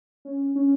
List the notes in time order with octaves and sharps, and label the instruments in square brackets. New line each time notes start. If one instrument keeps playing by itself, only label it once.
[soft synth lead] C#4
C#4